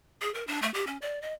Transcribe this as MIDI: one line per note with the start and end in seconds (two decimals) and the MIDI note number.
0.22 0.33 68
0.34 0.46 70
0.47 0.60 62
0.62 0.73 57
0.74 0.85 67
0.87 0.97 61
1.02 1.22 74
1.22 1.33 75